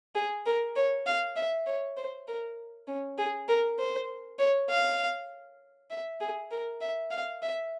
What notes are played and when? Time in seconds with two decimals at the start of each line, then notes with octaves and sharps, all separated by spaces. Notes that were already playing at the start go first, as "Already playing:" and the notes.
0.15 G#4
0.46 A#4
0.76 C#5
1.06 F5
1.36 E5
1.66 C#5
1.97 C5
2.27 A#4
2.87 C#4
3.18 G#4
3.48 A#4
3.79 C5
4.39 C#5
4.69 F5
5.90 E5
6.21 G#4
6.51 A#4
6.81 E5
7.11 F5
7.42 E5